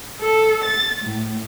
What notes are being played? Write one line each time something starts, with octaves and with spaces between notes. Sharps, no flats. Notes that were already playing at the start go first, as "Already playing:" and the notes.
A4
A6
A2